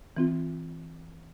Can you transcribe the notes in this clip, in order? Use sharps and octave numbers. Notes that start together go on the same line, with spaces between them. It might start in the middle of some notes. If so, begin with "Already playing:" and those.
E3 C4 F4